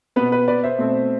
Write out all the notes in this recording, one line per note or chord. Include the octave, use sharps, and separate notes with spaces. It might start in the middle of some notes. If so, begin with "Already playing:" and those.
B2 B3 B4
B4
B4 D5
C5 E5
B2 A3 C4